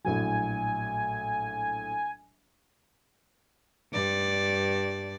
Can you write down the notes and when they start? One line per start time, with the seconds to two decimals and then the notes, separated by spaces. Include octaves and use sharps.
0.05 A#1 A2 F#3 G#5
3.92 G2 D5